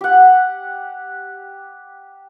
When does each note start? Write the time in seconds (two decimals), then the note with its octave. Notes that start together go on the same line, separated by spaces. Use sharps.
0.01 G4 F#5